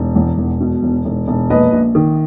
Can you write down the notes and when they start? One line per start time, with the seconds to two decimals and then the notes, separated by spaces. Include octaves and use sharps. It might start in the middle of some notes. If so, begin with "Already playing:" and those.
Already playing: E1
0.15 E2
0.38 E1
0.60 B2
0.83 E1
1.05 E1
1.28 E1
1.50 A#1 B4 D#5
1.72 A#1
1.95 D#3